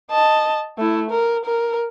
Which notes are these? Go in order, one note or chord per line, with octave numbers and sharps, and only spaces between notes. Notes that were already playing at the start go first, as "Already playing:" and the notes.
D#5 A5
A3 E4
A#4
A#4